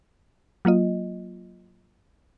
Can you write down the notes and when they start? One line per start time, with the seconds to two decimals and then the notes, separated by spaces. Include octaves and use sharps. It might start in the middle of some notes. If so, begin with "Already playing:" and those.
0.65 F#3 A#3 F4 D#5